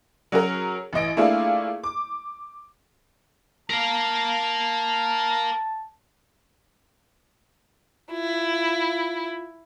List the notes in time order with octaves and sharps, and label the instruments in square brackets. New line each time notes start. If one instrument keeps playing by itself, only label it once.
[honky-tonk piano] F#3 C#4 F#4 G#4 A#4
A1 E3 D#5 D7
A3 A#3 D4 E4 F4 G#4
D6
[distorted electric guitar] A#4 F5 [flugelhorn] A5
[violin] E4 [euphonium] F4